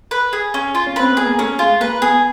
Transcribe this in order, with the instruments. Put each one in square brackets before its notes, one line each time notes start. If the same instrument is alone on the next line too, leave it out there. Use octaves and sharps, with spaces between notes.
[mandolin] B4
G#4
C#4
F4
[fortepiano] C#4
[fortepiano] C4 [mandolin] B4
[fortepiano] B3 [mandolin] G#4
[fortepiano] A#3
[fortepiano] A3 [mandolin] C#4
[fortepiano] G#3 [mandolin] F4
[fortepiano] A#3 [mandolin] B4
[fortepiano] B3 [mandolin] G#4